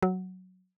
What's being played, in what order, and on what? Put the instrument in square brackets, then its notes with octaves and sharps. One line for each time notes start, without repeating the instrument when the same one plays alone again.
[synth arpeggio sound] F#3